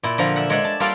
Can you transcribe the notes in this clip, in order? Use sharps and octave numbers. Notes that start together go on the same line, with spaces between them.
A#2 E4
D3 F3 A#5
E5 F#5
G#3 C#5 D5 E5 F#5
A5
G3 A#3 F4 A4 D5 F5